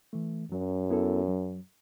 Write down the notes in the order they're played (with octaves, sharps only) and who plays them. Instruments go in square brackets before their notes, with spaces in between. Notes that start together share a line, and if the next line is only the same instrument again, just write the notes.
[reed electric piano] E3 A3
[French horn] F#2 [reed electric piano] F#3
[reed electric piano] B3 E4 A4
F#3